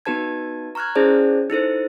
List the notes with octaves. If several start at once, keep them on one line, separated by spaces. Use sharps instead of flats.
B3 D#4 F#4 B4 A5 G#6
A#5 C#6 F6 F#6 G#6
C#4 E4 G#4 C5 D5 A5
D#4 E4 A4 C5